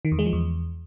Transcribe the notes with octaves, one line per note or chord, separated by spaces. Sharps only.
D#3
E2
G#3
F3
E2